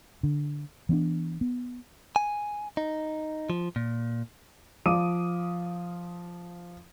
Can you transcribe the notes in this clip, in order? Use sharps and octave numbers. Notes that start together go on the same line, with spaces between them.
D3
E3 B3 C#4 D4
B3
G#5
D#4
F3
A#2
F3 F5 D6 D#6 D#7